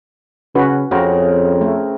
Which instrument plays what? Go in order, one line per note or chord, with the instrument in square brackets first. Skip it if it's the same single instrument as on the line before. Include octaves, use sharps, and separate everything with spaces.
[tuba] C#3 [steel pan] C#4 F#4 B4
[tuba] F2 [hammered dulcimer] C#3 C4 A#4 [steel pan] F#4
[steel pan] A3